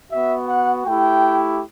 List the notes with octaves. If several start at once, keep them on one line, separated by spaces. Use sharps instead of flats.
B3 F#4 E5
F#5
A3 E4 G4 G5